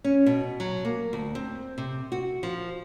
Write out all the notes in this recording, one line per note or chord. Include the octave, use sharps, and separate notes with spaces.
C#4
B2
F#3
A#3
D2
C4
C3
F#4
F3